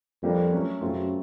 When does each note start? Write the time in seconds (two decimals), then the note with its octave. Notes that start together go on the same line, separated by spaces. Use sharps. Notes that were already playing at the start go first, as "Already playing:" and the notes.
0.23 F2 G3 A#3 D4 G4 A#4
0.52 F#3 A3 C#4
0.81 F#2 C#3 F#3 A3 C4 F4